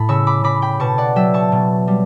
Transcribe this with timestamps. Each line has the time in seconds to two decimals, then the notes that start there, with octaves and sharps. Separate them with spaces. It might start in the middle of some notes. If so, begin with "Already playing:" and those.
Already playing: A2 A5 B5
0.09 C#3 C#6 E6
0.27 B5 D6
0.44 C#3 B5 D6
0.62 G5 B5
0.80 B2 A5 C#6
0.98 D5 F#5
1.16 F#3 E5 G5
1.34 A5 C#6
1.52 B2
1.88 G3